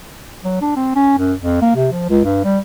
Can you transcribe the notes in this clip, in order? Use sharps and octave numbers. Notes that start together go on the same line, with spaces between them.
F#3
D4
C4
C#4
F#2
F2
A#3
C3
F3
C#2
G2
G3